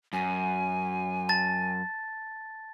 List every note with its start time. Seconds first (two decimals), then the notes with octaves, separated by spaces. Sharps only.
0.13 F#2 G#5
1.29 A5 A6